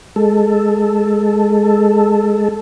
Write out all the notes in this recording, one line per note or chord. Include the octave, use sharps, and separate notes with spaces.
G#3 A4